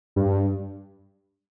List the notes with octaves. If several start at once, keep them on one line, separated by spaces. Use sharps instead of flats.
G2